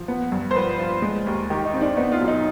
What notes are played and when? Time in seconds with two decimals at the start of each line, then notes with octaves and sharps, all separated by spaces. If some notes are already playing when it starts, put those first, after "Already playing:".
Already playing: F3
0.08 B3
0.32 G2
0.51 C5
0.56 F3 B4
0.79 F4
1.02 G#3
1.27 D#2
1.50 D#3 G4
1.65 D#4
1.74 C4
1.81 D4
1.97 B3 D#4
2.12 F4
2.20 B1
2.28 D#4